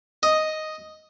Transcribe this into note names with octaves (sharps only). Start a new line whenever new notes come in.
D#5